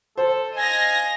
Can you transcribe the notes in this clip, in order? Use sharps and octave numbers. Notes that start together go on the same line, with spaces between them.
A4 C5
D#5 F5 G#5 A#6